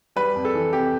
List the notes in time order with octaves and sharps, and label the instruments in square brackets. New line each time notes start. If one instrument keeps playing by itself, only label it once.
[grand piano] G3 B4
F2
A4
E3
C3 G4